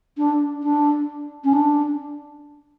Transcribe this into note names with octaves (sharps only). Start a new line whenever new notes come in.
D4
D4
C#4
D4